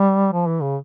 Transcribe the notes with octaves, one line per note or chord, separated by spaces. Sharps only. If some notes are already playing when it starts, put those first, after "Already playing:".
Already playing: G3
F3
E3
C#3